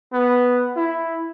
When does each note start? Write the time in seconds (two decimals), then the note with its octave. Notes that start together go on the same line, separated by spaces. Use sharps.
0.13 B3
0.76 E4